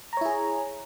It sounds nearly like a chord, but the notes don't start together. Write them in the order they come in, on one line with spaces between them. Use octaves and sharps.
A#5 C#5 E4 G#4